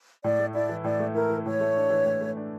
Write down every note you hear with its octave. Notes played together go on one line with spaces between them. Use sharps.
A2 D5
A3
E4 D5
E3
A2 D5
A3
E4 A#4
E3
A2 C#5
A3
D4
E3
A2
A3
D4